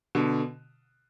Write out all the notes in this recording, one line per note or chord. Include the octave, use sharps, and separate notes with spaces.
B2 D3